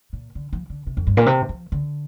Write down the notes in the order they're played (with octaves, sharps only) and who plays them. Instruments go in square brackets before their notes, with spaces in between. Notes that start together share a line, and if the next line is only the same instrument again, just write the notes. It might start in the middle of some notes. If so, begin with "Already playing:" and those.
[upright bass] A#2
D3
F3
D3
C3
F2
G2
A#2
C3
F3
D3